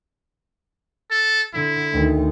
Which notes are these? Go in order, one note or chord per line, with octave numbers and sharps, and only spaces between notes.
A4
D3 E4
D2 D#3